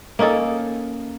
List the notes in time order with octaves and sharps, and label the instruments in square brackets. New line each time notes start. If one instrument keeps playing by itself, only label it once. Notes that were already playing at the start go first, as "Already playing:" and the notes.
[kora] A#3 C#4 D#4 A4